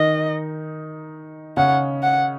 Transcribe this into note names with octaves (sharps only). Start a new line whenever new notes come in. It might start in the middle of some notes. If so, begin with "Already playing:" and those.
Already playing: D#3 D#4 D#5
C#3 C#4 F#5
F#5